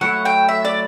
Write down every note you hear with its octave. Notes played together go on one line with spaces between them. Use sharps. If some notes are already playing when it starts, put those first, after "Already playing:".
F#3 A3 E4 F#5
G5
E5
D5